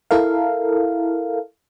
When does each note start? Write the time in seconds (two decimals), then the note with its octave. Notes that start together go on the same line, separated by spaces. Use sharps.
0.11 E4 A4 A#4 F5